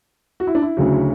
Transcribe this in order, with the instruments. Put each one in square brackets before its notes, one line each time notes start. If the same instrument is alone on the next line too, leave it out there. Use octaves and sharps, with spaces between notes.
[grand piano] F#4
E4
D4
E4
D2 C#3 F#3